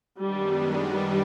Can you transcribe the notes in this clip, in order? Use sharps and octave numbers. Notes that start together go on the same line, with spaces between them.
F#2 D#3 G3 G#3 B3 D4
G3